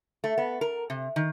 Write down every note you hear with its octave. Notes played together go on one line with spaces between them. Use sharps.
A3
B3
A#4
C3
D#3